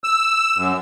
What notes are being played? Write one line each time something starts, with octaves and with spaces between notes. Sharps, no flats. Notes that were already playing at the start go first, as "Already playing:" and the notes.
E6
F#2